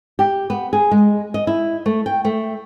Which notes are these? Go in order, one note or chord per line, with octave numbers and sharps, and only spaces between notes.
G4
B3
G#4
G#3
D#5
E4
A3
G5
A3